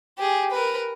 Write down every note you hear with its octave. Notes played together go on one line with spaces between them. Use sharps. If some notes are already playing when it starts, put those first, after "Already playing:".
G4 G#4
A#4 B4